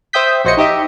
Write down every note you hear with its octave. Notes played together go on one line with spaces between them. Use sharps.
C5 E5 G5 D#6 G6 B6
A#1 F#4 C5 C#5 D#5 C#7
D#4 G4 D#5 E5